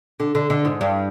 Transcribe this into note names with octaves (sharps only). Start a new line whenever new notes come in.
D3
D3
D3
G#2
G2